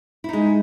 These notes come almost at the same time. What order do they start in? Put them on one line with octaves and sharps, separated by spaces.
E4 D#4 G#3